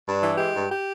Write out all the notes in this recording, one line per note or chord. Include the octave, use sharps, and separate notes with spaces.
G2 D4
E3
G#3 G4
G2
G4